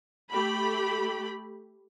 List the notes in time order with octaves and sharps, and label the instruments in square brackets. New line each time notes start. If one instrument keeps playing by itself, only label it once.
[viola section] A3 G4 B5